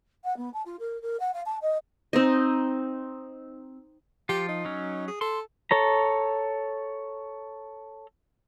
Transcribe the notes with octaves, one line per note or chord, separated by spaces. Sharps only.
F#5
B3
A5
F4
A#4
A#4
F#5
F5
A5
D#5
C4 D#4 D#5
F3 F4 G4
D#4
F#3 C#4
G#4
A4 C6
A4 C#5 A#5